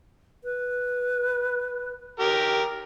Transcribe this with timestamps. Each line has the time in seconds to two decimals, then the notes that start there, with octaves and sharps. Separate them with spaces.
0.44 B4
2.20 G4 A#4